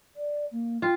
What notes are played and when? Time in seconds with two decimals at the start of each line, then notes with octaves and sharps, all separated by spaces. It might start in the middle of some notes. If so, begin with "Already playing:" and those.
0.16 D5
0.52 A#3
0.82 F4 G5